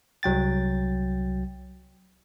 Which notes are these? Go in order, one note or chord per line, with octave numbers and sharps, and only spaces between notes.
C2 F#3 G5 A6